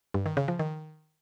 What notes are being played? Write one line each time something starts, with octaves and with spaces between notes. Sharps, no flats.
G2
D#3
C#3
F3
D#3